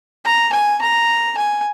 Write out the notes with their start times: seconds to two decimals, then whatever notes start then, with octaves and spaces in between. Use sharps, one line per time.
0.25 A#5
0.53 G#5
0.82 A#5
1.37 G#5